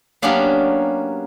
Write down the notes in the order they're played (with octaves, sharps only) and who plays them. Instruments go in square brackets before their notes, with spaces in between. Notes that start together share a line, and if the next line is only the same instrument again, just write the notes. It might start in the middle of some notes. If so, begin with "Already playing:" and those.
[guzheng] F#3 A#3 B3 C#4 D4 G4